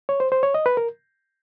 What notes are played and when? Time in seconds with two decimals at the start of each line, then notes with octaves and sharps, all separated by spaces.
0.09 C#5
0.20 C5
0.32 C5
0.43 C#5
0.54 D#5
0.66 B4
0.77 A#4